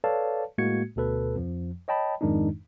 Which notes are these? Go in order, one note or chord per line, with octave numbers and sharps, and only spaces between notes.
A4 B4 C#5 D5 F5 A5
A2 G#3 A#3 F#4 G#6 C#7
D2 B2 A4 B4
F2 F3
C#5 D#5 G5 A5 B5
F2 G#2 D#3 G#3 D4 D#4